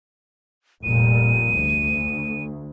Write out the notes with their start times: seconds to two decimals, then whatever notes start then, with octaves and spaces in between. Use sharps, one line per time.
0.83 F1 A#2 G3 D#7
1.58 D2